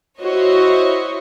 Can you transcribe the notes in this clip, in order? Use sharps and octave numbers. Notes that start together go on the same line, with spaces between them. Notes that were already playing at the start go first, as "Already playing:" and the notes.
E4 F#4 C5 C#5 D#5